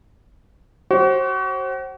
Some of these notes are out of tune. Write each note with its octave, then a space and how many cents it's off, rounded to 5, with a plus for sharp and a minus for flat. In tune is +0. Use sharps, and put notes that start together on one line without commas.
F#4 +35 C5 +35